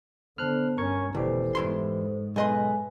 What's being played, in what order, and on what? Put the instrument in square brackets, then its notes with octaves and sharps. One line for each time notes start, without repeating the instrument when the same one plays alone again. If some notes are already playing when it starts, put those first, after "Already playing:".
[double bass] D3 [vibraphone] B3 C5 A5 [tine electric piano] F6 F#6
[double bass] G2 C#4 [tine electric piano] A#4 C#6 G#6 [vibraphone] A#5
[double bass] F1 B2 [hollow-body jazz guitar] D3 [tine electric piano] E3 G4 [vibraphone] A4 C5
[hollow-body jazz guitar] E2 E4 C6 [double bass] G#2
[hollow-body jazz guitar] B1 D#5 C6 [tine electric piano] G#3 A4 B4 [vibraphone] G#5